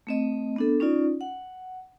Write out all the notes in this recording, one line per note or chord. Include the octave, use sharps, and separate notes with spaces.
A3 C4 D#5
B3 D4 A4
C#4 D#4 F4 D5
F#5